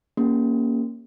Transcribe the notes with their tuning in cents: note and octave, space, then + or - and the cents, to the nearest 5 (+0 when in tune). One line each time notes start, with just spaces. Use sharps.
A#3 +5 C#4 +0 G4 +30